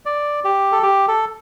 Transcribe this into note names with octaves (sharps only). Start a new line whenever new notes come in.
D5
G4
A4
G4
A4